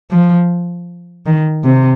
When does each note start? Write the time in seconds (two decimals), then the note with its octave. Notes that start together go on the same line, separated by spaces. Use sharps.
0.11 F3
1.26 D#3
1.64 C3